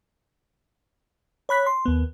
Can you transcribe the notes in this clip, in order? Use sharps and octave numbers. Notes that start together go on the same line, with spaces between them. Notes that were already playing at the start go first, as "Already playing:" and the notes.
C#5 B5 F#6 B6
C6
D#2 B3